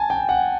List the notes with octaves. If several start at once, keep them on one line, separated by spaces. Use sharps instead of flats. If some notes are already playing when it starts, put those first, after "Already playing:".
Already playing: G#5 A5
G5
F#5